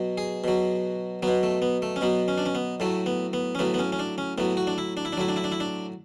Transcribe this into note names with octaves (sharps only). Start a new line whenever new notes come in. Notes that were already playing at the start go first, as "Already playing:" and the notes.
Already playing: B2 F#3
G#4
B2 F#3
B2 F#3 B3
A3
B3
A3
C#4
B2 F#3 B3
C#4
D4
C#4
B3
A2 F#3 A3
B3
B3
C#4
A2 F#3 B3
B3
C#4
C#4
D4
C#4
A2 F#3 B3
F#4
D4
E4
D4
E4
D4
A2 F#3 E4
D4
E4
D4
E4
D4